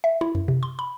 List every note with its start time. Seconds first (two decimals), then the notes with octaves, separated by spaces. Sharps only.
0.04 E5
0.21 E4
0.35 F#2
0.48 C3
0.63 C6
0.79 B5